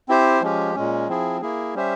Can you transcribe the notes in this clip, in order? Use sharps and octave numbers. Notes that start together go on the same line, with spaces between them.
C4 E4 G4 C5
F3 G#3 C#4 G4
A#2 G#3 C#4
F3 C4 E4 G#4
A#3 E4 G#4
G3 C#4 G4 C5 E5